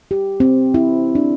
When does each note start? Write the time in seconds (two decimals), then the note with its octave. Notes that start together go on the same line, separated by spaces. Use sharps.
0.11 G4
0.40 C4
0.74 E4
1.15 D4